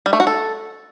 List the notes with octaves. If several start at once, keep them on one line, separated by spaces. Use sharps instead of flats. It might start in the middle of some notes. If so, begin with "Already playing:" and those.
G3
A3
F#4
A4